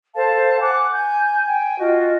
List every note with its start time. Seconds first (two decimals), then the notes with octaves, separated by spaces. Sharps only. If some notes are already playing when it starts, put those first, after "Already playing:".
0.15 A4 C5 F5 A5
0.60 F#5 G#5 D6 F#6
0.91 G#5 G6
1.44 G5 G#5
1.78 F4 F#4 D#5